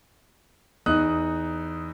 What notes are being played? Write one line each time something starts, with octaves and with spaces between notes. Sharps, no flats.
E2 D#4 D#6 F#6